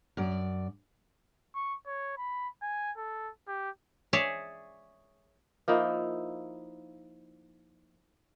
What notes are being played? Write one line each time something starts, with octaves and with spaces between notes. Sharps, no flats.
F#2 D5
C#6
C#5
B5
G#5
A4
G4
G#4 C#5 D5 E5
F3 A#3 D#4 E4